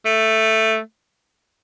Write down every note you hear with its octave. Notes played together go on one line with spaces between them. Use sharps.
A3